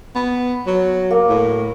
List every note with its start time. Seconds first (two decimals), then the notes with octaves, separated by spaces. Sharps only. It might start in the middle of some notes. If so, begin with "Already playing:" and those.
0.15 B3
0.67 F#3
1.11 A#3
1.29 A2